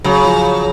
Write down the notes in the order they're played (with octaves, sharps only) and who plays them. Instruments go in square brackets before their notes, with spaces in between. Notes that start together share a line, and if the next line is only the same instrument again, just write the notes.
[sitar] C#3 [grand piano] F#3
[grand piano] F3